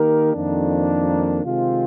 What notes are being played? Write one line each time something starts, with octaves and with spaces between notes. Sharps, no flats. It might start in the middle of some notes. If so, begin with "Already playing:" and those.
Already playing: D#3 A#3 D#4 G4 A#4
F2 D#3 A#3 D4
C3 D#3 G#3 C4 F4